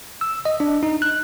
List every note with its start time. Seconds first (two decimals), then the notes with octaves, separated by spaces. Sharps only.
0.21 E6
0.45 D#5
0.60 D4
0.83 D#4
1.02 F#6